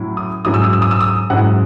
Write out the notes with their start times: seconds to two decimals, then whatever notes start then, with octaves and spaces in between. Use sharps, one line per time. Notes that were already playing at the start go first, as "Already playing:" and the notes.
Already playing: A2 F#3 C#4 E4
0.17 D#6
0.45 G#2 F#3 C#4 E4 D#6
0.54 E6
0.64 D#6
0.73 E6
0.82 D#6
0.91 E6
1.01 D#6
1.30 G#2 F#3 C#4 E4 F#5